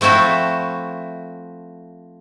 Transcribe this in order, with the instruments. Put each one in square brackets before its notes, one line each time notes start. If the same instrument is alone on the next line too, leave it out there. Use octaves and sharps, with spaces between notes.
[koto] F3 A3 C4 E4 F#4